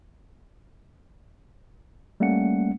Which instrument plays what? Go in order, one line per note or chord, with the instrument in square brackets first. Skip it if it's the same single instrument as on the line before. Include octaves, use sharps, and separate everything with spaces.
[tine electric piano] G3 A3 A#3 C#4 F#5 C#7